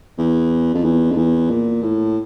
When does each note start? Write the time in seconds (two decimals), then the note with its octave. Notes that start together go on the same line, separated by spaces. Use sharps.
0.18 E2
0.74 F2
0.84 E2
1.11 F2
1.17 E2
1.50 A#2
1.83 A2